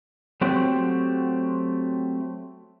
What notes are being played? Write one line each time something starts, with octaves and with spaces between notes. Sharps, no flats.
F#3 A3 C4 F#4 G4